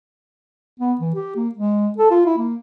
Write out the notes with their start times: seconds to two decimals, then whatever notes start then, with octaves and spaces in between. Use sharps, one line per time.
0.79 B3
1.00 E3
1.15 G4
1.36 A#3
1.55 G#3
1.98 A4
2.11 F4
2.26 E4
2.37 A#3